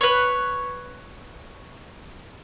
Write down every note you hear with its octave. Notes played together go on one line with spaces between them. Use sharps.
B4 C#5